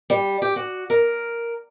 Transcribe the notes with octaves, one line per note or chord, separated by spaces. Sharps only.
G3
G4
F#4
A#4